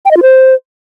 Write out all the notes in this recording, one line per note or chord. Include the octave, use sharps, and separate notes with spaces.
G5
D#5
F4
C5